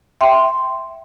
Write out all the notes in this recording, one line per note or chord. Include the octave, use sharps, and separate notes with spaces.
E5 G5 C6